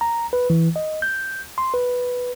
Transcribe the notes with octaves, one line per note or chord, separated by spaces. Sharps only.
A#5
B4
E3
D#5
G6
C6
B4